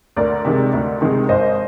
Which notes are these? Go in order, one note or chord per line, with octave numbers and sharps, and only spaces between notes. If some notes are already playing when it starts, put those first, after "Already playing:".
D2 A#4 D5
C3 D#3 G#3
D2
C3 D#3 G#3
G#1 C5 D#5